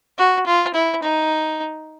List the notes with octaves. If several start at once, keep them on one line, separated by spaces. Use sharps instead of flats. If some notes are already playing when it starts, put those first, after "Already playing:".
F#4
F4
E4
D#4